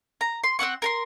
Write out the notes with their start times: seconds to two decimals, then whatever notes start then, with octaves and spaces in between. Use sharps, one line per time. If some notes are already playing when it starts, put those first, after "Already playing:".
0.21 A#5
0.44 C6
0.59 C4 C#4 F#5 C#6
0.82 A#4 A#5 C6